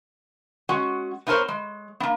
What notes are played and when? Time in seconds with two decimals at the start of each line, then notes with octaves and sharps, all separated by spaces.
0.69 G#3 C#4 F#4 F#5
1.27 B3 D#4 F4 A#4 C5 C#5
1.48 G#3
2.00 A#3 B3